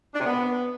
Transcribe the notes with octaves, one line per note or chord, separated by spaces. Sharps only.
D4
C3
B3